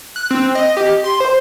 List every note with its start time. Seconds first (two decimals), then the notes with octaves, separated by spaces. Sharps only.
0.16 F#6
0.31 C4
0.55 D#5
0.77 G4
1.04 C6
1.20 C5